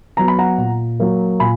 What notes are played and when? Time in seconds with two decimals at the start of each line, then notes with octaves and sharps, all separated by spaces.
0.17 F#3 B3 A#5
0.28 B5
0.39 F#5 A#5
0.58 A#2
1.00 F#3 A#3
1.40 A#2 G#5 B5